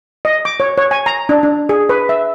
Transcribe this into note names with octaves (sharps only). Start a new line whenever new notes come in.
D#5
D6
C#5
C#5
G#5
A#5
D4
D4
G#4
B4
E5